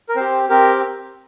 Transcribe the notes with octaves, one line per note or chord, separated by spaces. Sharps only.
A#4
C4 G4 C5
C4 G4 A#4